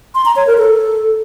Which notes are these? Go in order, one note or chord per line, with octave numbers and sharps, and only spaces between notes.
C6
A#5
C#5
A#4
A4